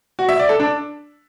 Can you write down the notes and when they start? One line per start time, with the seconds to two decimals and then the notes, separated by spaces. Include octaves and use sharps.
0.19 F#4
0.29 E5
0.39 D5
0.49 A4
0.60 D4